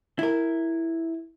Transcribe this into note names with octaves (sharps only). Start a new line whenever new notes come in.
E4 A#4